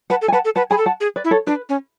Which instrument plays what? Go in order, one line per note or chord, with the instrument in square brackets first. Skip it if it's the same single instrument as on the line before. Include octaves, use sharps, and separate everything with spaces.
[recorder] B4 [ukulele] F#5 A5
[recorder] A4
[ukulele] G#5
[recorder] B4 [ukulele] F#5 A5
[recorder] A4
[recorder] B4 [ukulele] F#5 A5
[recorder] G#4 [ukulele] G#5 B5
[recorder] A4
[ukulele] F#5 A5
[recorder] G#4
[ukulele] B4 D5
[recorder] E4
[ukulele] A4 C#5
[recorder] D4 [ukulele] B4
[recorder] C#4